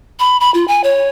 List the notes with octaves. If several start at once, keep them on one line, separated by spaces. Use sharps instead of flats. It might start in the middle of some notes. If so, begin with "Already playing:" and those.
B5
B5
F4
G#5
C#5